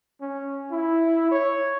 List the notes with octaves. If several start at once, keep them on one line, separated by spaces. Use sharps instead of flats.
C#4
E4
C#5